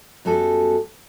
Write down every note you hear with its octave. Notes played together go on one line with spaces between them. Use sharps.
F#2 G3 B3 F#4 A4 G#5